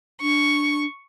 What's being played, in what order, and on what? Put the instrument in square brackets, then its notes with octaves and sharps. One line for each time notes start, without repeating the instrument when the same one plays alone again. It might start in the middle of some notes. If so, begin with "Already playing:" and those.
[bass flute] D4 [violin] C#6